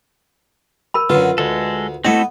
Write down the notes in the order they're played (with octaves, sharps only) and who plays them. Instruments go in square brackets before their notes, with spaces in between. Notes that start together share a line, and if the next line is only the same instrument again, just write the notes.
[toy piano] A#4 B5
[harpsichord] F#2 D3 [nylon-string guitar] F4 [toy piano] B4
[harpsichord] D2 [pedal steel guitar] G#3 A4
[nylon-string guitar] A3 E4 D#5 [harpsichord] B3 [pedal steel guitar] C4 F#4 A4